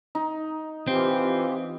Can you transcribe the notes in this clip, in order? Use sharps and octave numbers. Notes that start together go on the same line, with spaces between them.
D#4
E3 C4 F4 G4